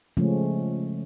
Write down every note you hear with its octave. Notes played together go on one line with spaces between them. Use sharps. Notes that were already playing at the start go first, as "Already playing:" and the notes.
C#3 F3 G#3 A3 C#4